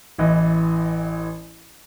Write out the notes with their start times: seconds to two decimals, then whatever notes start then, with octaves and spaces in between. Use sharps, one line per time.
0.18 A1 E3 D#5